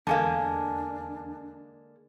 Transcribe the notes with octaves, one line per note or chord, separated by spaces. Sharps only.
E2 D3 G#3 A#3 D4 F5 G#5 A5